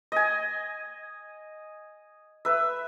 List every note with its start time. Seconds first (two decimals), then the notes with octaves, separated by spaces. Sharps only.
0.12 D#5 G#5
2.45 B4 E5